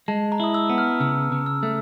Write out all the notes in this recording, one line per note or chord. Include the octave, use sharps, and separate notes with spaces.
G#3 A5
A#5
E4 D#6
E6
B3
F6
C#3 E6
C#3
E6
A3